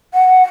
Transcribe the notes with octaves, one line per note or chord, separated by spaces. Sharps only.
F#5